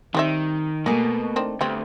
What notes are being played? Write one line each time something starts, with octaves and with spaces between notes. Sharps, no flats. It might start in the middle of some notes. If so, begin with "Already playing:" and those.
D#3 G3 C4 E5
B2 A3 A#3 F#4 G#4
D#3 C4 D4
D2 G3 B3 C4